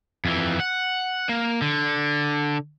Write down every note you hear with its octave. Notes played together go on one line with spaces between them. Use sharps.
F2 E3
F#5
A#3
D3